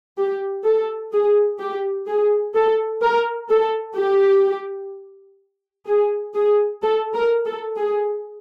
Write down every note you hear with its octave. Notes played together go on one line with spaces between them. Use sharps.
G4
A4
G#4
G4
G#4
A4
A#4
A4
G4
G#4
G#4
A4
A#4
A4
G#4